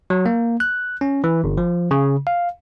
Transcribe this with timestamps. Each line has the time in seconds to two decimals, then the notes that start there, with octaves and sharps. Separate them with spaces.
0.10 F#3
0.26 A#3
0.60 F#6
1.01 C#4
1.24 E3
1.44 G1
1.58 F3
1.91 C#3
2.27 F5